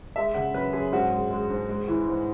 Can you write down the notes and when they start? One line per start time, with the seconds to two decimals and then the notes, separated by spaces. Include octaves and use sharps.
0.16 G#3 E5
0.34 C#3 F#5
0.54 F#2 B4
0.73 F#2 G#4
0.92 G#2 F#4
1.12 G#3
1.30 G#3
1.50 G#2
1.69 G#3
1.88 E3
2.08 G#2